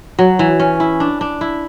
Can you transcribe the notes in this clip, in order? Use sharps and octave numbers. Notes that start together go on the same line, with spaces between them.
F#3
E3
C#4
E4
D4
D4
E4